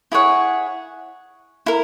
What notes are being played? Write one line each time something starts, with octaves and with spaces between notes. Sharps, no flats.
E4 G#4 C#5 F#5
E4 A#4